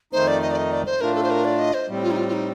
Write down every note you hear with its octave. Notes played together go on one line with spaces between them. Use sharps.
F2 D#3 A3 D#4 C5
D5
D#5
D5
D#5
D5
C5
A2 A3 D4 F4 A#4
A4
C5
A#4
D5
D#5
C5
A2 G3 C4
F4
D#4
F4
F4
D#4